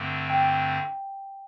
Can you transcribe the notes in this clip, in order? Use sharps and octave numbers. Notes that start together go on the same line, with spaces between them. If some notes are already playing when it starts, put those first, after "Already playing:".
Already playing: G2 D3 A3 C4
G5